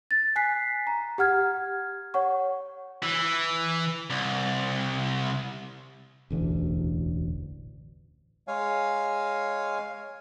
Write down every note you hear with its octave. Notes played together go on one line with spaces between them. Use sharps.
A6
G#5 F#6 B6 C7
A#5
G4 F#5 F6 G#6
C#5 F#5 C#6
E3
C2
E1 A1 D2
G#3 C#5 F5 G#5